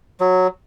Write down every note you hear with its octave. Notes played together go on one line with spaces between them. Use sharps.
F#3